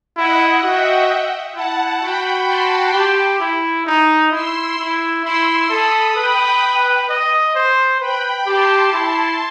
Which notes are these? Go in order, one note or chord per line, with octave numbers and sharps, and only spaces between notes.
E4 D#5 F#5
F#4 E5 G5
E4 F#5 A5
F#4 G5 B5
A5 C6
G4
E4
D#4
E4 C6 E6
E4
E4 C6 E6
A4 B5 D#6
B4 G5 B5
D#5
C5
B4 G5 B5
G4 A5 C6
E4